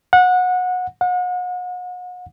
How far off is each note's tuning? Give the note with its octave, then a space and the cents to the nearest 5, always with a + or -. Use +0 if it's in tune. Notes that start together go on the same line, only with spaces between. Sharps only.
F#5 -25
F#5 -40